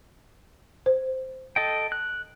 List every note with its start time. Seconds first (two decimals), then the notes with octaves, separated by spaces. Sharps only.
0.86 C5
1.56 A4 D#5 G5
1.92 F#6